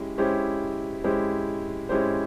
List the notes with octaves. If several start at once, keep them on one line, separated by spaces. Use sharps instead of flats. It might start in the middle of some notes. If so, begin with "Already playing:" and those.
Already playing: G#3 C#4 E4 G4
G#3 C#4 E4 G4 C5
G#3 C#4 E4 G4 C5
G#3 C#4 E4 G4 C5